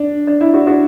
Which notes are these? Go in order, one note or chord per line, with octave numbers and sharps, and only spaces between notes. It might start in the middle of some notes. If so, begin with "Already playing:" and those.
Already playing: D4
D4
E4
D4 F#4
D4 F#4